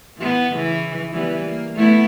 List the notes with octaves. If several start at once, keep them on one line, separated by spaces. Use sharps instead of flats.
E3 B3
C#3 E3
E3 G3 B3
A#3
A3 B3 E4